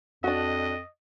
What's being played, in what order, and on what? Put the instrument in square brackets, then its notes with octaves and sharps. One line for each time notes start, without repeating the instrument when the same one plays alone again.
[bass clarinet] F2 [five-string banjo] D4 F#4 [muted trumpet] D#5